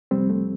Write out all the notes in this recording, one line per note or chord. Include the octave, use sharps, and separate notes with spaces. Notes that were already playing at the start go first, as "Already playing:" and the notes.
C2 C3 F3 G3 C4
A3